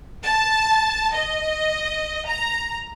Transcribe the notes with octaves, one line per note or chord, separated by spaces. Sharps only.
A5
D#5
A#5